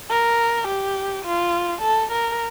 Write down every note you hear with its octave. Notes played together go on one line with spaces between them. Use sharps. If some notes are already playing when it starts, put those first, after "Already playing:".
A#4
G4
F4
A4
A#4